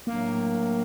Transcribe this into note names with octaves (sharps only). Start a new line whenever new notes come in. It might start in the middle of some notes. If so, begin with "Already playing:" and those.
A2 F#3 A3 A#3 D4